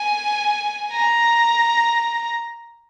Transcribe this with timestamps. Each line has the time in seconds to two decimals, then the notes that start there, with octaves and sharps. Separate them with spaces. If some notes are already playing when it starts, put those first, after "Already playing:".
Already playing: G#5
0.92 A#5